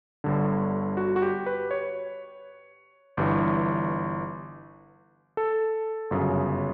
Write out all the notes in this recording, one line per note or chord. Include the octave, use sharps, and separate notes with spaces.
G1 G2 D3
F#4
F#4
G4
B4
C#5
G1 G2 E3
A4
G1 F#2 C#3